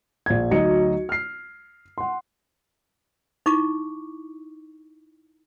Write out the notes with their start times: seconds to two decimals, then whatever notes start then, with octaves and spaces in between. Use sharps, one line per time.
0.26 A#1 G#6
0.51 D2 F#3 D#4 D#5 C#7
1.09 F6 C7
1.98 F#5 C6
3.46 D#4 E4 C#6 D6